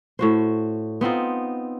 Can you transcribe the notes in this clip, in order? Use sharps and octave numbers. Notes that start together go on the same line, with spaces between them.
A2 F#4 C5
B3 C4 D#4 F4